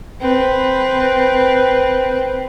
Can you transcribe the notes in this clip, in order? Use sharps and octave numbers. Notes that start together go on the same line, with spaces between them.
C4 B4